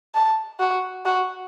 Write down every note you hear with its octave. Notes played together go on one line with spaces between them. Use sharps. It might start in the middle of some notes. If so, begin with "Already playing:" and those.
A5
F#4
F#4